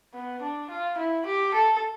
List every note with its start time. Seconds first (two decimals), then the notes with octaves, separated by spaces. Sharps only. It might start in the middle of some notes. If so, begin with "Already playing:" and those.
0.14 B3
0.41 D4
0.70 F4
0.97 E4
1.26 G4
1.54 A4